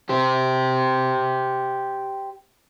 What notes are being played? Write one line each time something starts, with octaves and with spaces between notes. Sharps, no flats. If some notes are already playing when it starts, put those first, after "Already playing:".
G4 C5